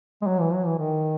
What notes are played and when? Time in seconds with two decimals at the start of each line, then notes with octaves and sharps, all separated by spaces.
0.22 G#3
0.27 F#3
0.40 E3
0.53 F#3
0.66 E3
0.78 D#3